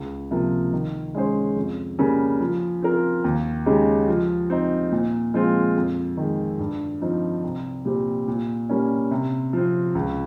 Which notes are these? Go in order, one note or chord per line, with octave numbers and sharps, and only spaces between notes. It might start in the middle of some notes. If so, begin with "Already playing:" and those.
Already playing: C#2
C3 F3 A#3
D#3
G#3 C#4 G#4 C5
F2
C#3 G3 A#3
F3
C4 F4 A#4
D#2
C#3 G#3 D#4 G4
F3
C4 D#4
A#2
F3 G#3 C4 F4
F2
D#3 G#3
G2
F3 C4 D#4
C2
A#2 G3 C4 G4
A#2
G3 A#3 C#4
C3
F3 C4
C#2